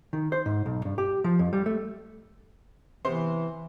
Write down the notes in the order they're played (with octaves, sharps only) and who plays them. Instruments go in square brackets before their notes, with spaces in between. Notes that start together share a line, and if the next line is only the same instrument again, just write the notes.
[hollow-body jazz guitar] D#3
C5
G#2
B1
G2
G4
F3
F2
G3
A3
[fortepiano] C3 B3 C5 [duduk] E3